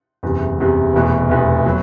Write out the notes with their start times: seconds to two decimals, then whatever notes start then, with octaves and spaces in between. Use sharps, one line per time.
0.23 F#1 E2 C3
0.58 F#1 E2 C3
0.93 F1 E2 B2
1.29 F1 E2 B2
1.65 B2 F#3